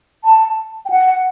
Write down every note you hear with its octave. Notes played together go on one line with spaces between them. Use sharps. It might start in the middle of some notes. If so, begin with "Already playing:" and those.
A5
G5
F#5